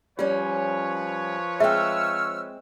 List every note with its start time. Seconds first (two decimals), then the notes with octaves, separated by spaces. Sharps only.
0.19 F3 G3 C#4 F4 B4 C#5
1.60 G#3 C4 E5 G5 C#6 E6 F6